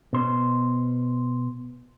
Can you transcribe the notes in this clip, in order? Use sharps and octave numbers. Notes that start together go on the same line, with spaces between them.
B2 C5